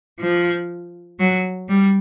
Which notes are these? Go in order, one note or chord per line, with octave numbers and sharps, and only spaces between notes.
F3
F#3
G3